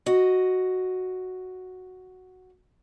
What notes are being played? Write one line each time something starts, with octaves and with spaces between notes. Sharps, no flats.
F#4 D#5